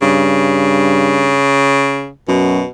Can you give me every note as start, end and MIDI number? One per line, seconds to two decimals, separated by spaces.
0.02 1.40 43
0.02 2.10 49
2.28 2.61 42
2.28 2.67 47